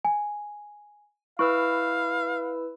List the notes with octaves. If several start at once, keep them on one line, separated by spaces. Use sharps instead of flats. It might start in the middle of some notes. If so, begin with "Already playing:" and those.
G#5
E4 B4 F5 C#6 E6